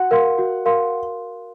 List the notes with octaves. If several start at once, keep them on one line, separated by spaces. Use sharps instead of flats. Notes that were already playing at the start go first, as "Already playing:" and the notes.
Already playing: F#4 F#5
A#4 F5 C6
F#4
A#4 F5 C6